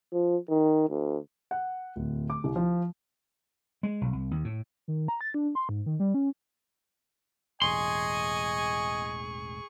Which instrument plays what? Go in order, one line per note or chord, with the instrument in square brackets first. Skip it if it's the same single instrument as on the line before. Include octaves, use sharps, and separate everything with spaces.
[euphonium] F3
D#3
D2
[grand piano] F#5
D1
D6
C2
F3
[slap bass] G#3
B1
C2
D#2
A2
[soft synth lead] D#3
A#5
A6
D4
C6
G#2
D#3
G3
C#4
[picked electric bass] E1 A1 [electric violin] G#4 C#6 [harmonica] D#5 G#5 [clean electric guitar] C6